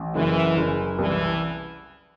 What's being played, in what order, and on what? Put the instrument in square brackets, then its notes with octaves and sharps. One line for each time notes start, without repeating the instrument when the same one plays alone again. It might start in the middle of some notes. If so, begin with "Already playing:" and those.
Already playing: [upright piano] A1
[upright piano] F#1 [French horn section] E3
[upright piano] F#1
[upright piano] C2 [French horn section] E3